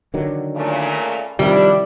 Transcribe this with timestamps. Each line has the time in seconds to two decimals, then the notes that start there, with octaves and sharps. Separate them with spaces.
0.14 D3 D#3 F#3
0.55 A#2 C#3 A3
1.39 C3 D#3 F3 G3 D4 E4